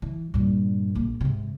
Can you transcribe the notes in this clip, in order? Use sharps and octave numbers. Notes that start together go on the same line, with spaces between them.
E3
G2 A#2
A#1 A#3
G#2 C3